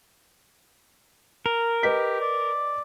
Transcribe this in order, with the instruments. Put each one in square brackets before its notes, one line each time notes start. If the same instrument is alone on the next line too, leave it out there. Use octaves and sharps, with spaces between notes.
[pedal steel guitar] A#4
[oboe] G4 [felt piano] B4 D#5 B6
[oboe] D5